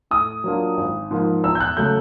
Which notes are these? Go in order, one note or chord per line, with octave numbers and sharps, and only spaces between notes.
A2 D#6
F#3 A#3 D4 F4
G#1
G#2 F3 A#3
E2 E6
G6
F#6
C#3 F#3 A3 G6